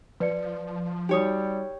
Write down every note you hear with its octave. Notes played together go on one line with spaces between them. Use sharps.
F3 B4 D5 C#7
G3 D#4 F#4 G4 C#5 D#6